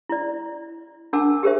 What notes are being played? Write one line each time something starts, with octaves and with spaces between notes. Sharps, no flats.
E4 D5
D4 A#4 F#5 A5 D6 E6
G4 G#4 A#4 C5 E5